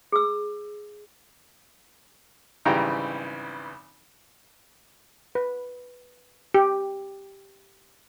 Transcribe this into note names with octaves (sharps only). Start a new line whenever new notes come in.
G#4 E6
G#1 C#3 E3 G3 G5 A#5
B4
G4